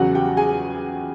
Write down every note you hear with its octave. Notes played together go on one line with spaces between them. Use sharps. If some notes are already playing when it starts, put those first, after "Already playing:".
Already playing: E2 C#3 F#3 F#4 F#5
G4 G5
G#4 G#5